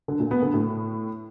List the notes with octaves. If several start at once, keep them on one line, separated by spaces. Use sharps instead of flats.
D3
A#2
B3
D3
A2